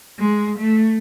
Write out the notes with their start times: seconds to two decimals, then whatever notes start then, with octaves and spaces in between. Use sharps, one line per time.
0.19 G#3
0.59 A3